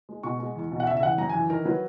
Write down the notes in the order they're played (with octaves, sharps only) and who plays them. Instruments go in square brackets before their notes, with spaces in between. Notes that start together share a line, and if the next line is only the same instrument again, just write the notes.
[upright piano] G#3
B2 C#6
G#3
E2
B2
F#5
C#3 E5
E5
E3 F#5
F#2 A#5
E3 G#5
D#3 A#4
F#3 B4